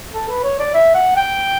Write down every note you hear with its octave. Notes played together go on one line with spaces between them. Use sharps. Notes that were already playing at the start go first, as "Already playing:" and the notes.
A4
B4
C#5
D5
E5
F#5
G5